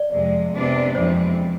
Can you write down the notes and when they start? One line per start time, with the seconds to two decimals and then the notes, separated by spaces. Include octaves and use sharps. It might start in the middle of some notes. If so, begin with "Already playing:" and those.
Already playing: D5
0.12 F2 C3 G#3
0.54 C3 G#3 B3 D4
0.95 F2 E3 G#3 C4 C5